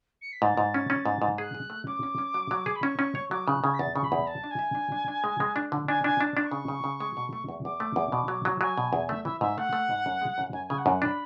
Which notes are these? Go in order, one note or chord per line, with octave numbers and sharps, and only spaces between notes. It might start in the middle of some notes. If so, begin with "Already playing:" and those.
C#7
B6
G#2 A6
G#2
C#4
C#4
G#2
G#2
G#4 F#6
G#4
A3
C#4 D6
C#4
C#4
F#3
F#3
G#4
B5
C#4 C#6
C#4
C#5
F#3 D6
C#3 F#6
C#3 G#6
B6
E2 A6
C#3 C#6
B5
E2
E5 A5
D4
G#5
E5
D4
D4
D4
G#3
G#3
D4
D3
D4 G#5
D4 G#5
D4 A5
D4
C#6
C#3
C#3
C#3
G#3
B2
A3
E2
E2 D6
A3
E2
B2
F#3
F#3
F#3 G#5
B2
E2
A3 E5
E3 E5
G#2 E5
A3 F#5
A3
G#2
F#2
G#3
F#2
F#2 G#5
C#3 G#5
F#5
F#2
D4 B5